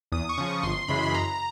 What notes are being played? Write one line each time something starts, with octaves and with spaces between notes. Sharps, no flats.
E2 D#6
C#6
C#3 F3
C#6
G1 C6
F#2 C#3 E3 G#3 B5
B5
F#2 A#5